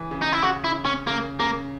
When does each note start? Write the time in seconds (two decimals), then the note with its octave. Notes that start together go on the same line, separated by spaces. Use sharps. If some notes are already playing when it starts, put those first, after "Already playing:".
Already playing: C#3 E3
0.11 C#3
0.22 D#4
0.32 E4
0.43 C#3 F#4
0.64 E4
0.85 C#4
1.07 C#3 A#3
1.39 C#3 A#3